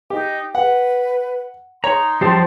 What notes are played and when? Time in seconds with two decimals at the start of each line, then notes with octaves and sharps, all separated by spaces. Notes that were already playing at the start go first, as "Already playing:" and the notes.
0.10 D#4 G4 D#5
0.55 B4 F#5
1.84 D#4 C#5 A#5 C6
2.21 F#2 F3 G3 C5 A5